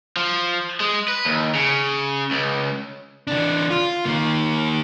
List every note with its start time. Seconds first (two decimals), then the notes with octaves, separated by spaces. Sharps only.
0.17 F3
0.80 G#3
1.08 B4
1.25 D#2
1.55 C#3
2.31 C#2
3.27 E3 D4
3.70 F4
4.05 D#3 A#3